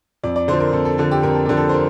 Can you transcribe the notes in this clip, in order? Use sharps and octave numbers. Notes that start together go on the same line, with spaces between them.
F2 D5
D5
D3 F3 C5
A#4
F2 A4
A4
D3 F3 A4
G4
F2 A#4
A4
D3 F3 G4
A4
C5
A#4